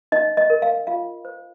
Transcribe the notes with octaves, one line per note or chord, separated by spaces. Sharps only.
D#4 D#5
D#5
A#4
F5
F4 F5
C5